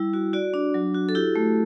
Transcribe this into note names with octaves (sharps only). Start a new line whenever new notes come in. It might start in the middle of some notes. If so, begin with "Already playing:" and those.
Already playing: G3 E4
F#4
F#4 D5
D4
F#3
F#4
A4
E4 G4
A3